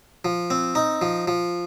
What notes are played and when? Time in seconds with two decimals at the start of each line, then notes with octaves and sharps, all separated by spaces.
0.25 F3
0.50 C4
0.75 D#4
1.02 F3
1.28 F3